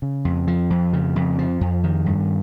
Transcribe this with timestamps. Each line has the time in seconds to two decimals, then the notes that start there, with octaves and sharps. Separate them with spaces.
0.02 C#3
0.25 F2
0.47 F3
0.70 F2
0.93 C#3
1.16 F2
1.38 F3
1.61 F2
1.84 D#3
2.06 G2